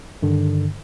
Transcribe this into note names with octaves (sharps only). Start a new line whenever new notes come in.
G2 D3 D#3